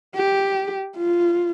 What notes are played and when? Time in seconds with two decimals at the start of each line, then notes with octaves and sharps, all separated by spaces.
0.15 G4
0.97 F4